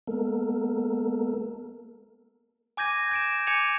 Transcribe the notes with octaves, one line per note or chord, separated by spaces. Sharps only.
G#3 A#3 B3 A4 A#4
G#5 D6 G6 G#6 A#6 D#7
G6 D7 E7
G#5 D6 G#6 C#7 D#7 F7